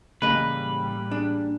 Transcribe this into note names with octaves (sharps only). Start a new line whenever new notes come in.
A1 A2 C#3 G3 A#3 B4 D#5
D4 G#4